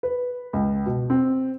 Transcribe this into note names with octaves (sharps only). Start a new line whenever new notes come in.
B4
C#2
B2
C4